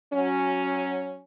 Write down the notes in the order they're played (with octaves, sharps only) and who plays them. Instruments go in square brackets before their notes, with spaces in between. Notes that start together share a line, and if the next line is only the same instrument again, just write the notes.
[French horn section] F#3 C#4